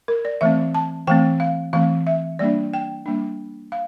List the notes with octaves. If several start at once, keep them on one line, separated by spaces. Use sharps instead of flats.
A#4
D5
E3 A3 C4 E5
A5
E3 A3 C4 G5
F5
E3 A3 C4 F5
E5
G3 A#3 D4 D5
G5
G3 A#3 D4
F5